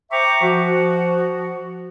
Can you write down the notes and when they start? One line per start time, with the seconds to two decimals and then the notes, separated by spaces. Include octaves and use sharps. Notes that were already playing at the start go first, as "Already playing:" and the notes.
0.11 C5 E5 G5 A#5 C#6 D6
0.42 F3 F#4